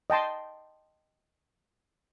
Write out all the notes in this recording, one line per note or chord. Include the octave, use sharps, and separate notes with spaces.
D#5 G5 A5 C6